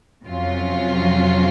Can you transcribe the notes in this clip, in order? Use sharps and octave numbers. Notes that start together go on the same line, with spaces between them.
F2 C3 F#3 C#4 F4